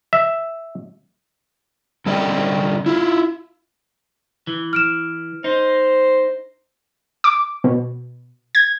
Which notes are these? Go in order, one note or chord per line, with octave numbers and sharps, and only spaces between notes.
E5
D3 G3 A4 D5 D#5 G5
E4 F4
E3
F6 D7 E7
D#4 C5
D6
B2
G#6